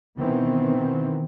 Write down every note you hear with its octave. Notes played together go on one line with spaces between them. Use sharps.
B2 D#3 E3 B3 C4